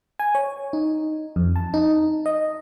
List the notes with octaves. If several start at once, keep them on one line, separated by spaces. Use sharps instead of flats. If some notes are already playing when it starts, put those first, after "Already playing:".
G#5
C#5
D#4
F2
A5
D#4
D#5